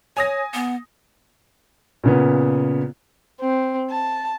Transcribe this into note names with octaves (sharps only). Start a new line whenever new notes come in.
C#5 G#5 D#6 A#6
B3
A#2 C#3 B3
C4
A5